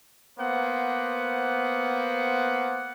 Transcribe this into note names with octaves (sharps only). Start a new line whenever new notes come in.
A#3 B3 C5 F#5